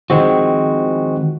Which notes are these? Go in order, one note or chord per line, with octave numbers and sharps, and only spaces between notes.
D#3 F3 G#3 C4 F#4